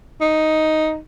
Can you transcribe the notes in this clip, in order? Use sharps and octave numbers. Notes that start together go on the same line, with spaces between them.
D#4